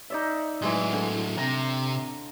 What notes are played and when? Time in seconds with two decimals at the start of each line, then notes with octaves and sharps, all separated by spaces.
0.10 D#4 D5 E5
0.62 A2 E3 F#3 G#3
0.93 D3
1.37 C3 A#5